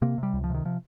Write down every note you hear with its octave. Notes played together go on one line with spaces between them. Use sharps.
C3 A#3
C3 G3
C#2
F3
C3 D#3
C3 F3